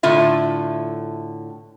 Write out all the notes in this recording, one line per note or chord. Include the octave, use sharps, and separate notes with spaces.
A2 D3 F4 E5